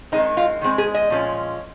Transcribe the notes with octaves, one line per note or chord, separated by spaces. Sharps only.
D#3 G#3 C4 D#4
F4
D#3 G#3 C4
G#4
D#5
A#2 F3 G#3 C#4